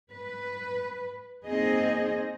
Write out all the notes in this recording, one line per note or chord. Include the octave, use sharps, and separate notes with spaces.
B4
A#3 C4 D#4 G#4 D#5